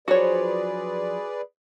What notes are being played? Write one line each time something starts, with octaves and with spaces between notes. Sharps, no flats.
F3 F#3 D4 F#4 G#4 B4 C#5 D5